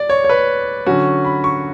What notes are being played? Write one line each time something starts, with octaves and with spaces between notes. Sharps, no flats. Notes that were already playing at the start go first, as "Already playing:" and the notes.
Already playing: D5
C#5
C#5
B4
D3 F#3 C#4 F#4
B5
C#6